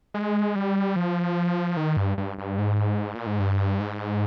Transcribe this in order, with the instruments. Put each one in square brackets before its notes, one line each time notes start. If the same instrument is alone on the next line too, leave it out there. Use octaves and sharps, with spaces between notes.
[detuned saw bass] G#3
G3
F3
D#3
G2
G2
G2
G#2
A#2
G#2
G2
G#2